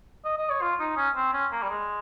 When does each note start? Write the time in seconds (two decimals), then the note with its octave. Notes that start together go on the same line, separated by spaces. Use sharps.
0.25 D#5
0.38 D#5
0.50 C#5
0.61 F4
0.80 D#4
0.97 C#4
1.16 C4
1.33 C#4
1.52 A#3
1.62 G3
1.69 G#3